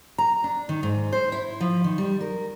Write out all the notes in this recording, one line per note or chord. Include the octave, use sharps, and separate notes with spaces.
A#5
D4
D#3
G#2
C5
E4
F3
D#3
G3
A#4